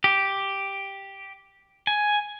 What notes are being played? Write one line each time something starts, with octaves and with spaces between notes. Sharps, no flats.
G4
G#5